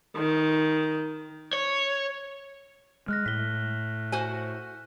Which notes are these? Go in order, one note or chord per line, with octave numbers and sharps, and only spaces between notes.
D#3
C#5
G#3 F6 F#6 A#6
A2 B6 G7
F#4 C5 G#5